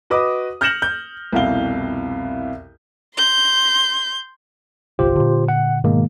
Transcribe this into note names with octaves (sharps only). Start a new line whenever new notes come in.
F#4 B4 D#5 D6 D#6
F6 G6 A#6 C#7 E7 F#7
G6
C2 F2 B2 E4 F5 G7
C6 G6
G1 C2 F4 G4 C5
A#2 D3
F#5
G#2 B2 D#3 G#3 A#3